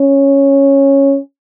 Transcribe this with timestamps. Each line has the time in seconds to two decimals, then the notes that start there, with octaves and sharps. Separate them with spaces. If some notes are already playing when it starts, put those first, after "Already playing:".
Already playing: C#4